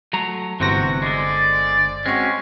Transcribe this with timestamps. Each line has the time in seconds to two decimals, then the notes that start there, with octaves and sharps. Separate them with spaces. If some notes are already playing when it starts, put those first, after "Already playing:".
0.13 F#3 A3 A#5
0.60 G1 A2 C3 E3 F#4 C5 A#6
1.02 D3 G#3 D5
2.06 G#3 C4 C#4 F#4